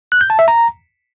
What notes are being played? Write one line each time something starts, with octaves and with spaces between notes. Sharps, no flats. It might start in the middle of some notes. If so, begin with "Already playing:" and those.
F#6
G6
A5
E5
A#5